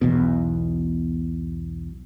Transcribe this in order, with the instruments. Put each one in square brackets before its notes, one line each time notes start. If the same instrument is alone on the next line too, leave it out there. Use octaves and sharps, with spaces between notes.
[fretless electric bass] B1 E2 B2